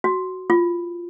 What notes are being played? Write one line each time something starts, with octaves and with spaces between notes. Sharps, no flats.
F#4
F4